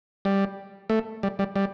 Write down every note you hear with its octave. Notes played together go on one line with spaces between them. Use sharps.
G3
A3
G3
G3
G3